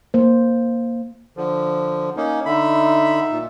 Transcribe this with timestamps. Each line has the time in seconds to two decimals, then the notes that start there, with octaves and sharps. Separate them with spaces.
0.14 A#3 C5
1.37 D3 F3
2.17 A#3 C#4 D#4
2.46 D3 D#4 E5 B5
3.31 A#2